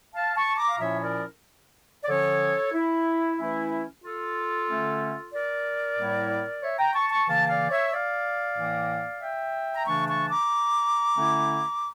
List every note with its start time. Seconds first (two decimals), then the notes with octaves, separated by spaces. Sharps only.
0.14 F5 A5
0.36 A5 C#6
0.57 A#5 D6
0.69 F5
0.79 A#2 F3 C#4 E4 C#5 E5
1.01 A#4 D5
2.03 D5
2.09 D3 F3 C#4 A4 C#5
2.74 E4
3.38 E3 A3 C#4 E4
4.03 F4 A4
4.68 D3 A3 C#4
5.33 A#4 D5
5.98 A2 G3 A#3 E4
6.63 C#5 E5
6.78 G5 A#5
6.95 A5 C#6
7.11 A5 C#6
7.28 C#3 E3 A#3 F5 A5
7.49 D5 F5
7.70 C#5 E5
7.92 D5 F5
8.57 A2 E3 A#3
9.21 E5 G5
9.75 A#5
9.86 C#3 E3 A3 D4 A5 C#6
10.08 A5 C#6
10.29 A#5 D6
11.16 D3 A3 C#4 E4